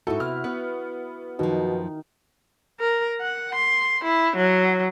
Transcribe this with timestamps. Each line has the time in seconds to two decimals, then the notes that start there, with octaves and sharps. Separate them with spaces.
0.07 G#2 D#4 E4 F#4 A4
0.20 C3 B3 F6
0.44 B3 B4
1.39 F#2 B2 D#3 F3 D#4
2.80 A#4
3.21 F#5
3.55 C6
4.04 E4
4.36 F#3